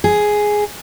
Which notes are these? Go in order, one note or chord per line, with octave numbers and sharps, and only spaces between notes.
G#4